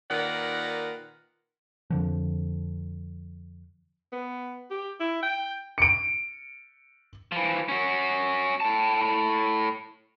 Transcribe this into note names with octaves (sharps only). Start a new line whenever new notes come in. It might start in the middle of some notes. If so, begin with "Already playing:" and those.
A#2 D#3 A#4 B4 D5 F#5
F2 D3 F3
B3
G4
E4
G5
C#7 D7
E3 F3
C#4 F#4
A2 A5